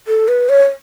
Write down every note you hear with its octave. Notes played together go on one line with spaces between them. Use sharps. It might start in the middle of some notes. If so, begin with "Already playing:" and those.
A4
B4
C#5